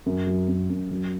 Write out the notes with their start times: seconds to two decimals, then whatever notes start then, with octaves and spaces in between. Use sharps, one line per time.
0.06 F#2
0.27 F#3
0.48 F#2
0.69 F#2
0.91 F#3